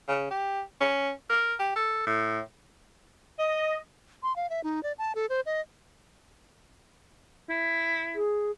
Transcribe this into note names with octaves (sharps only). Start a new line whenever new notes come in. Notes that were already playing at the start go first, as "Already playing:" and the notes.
C#3
G4
C#4
A#4
G4
A4
A2
D#5
C6
F5
E5
D#4
D5
A5
A4
C5
D#5
E4
G#4